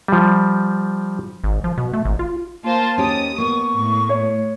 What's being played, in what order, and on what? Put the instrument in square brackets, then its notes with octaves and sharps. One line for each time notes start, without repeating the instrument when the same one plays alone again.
[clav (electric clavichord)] F3 G3
[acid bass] G#1
F3
B2
A3
G#1
F4
[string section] A#3 F4 C5 [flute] A5
[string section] D#2 D#6 [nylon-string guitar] C#4 G4
[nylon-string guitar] A#3 B3 [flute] C#6
[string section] A2
[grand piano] C#5